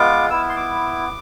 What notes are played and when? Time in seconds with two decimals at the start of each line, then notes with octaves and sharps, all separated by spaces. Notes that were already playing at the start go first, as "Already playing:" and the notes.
Already playing: G#3 B3 F4 D6
0.30 B3 E4 E6
0.49 C6
0.57 D6